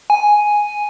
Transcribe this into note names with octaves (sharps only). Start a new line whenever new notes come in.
G#5